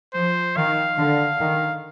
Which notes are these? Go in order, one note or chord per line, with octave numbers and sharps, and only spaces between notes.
F3 C5
D#3 F5
D3
D#3